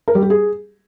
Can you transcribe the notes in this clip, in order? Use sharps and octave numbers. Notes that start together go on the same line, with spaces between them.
A#4
G3
G4
G#4